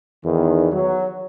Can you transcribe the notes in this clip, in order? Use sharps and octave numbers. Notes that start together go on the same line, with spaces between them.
E2 D#3
F#3